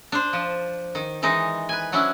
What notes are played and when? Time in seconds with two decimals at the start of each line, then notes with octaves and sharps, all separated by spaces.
0.12 D4 C5
0.33 F3
0.95 D#3
1.22 D#3 E3 G#3 D#4 D#5
1.69 B4 G#5
1.92 F#3 C#4 D4 E4